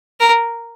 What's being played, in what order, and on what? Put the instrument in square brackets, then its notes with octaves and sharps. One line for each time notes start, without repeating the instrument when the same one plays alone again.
[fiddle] A#4